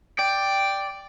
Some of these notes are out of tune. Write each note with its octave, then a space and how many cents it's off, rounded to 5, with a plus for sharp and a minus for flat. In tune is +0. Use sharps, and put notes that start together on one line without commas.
D5 +0 G5 +0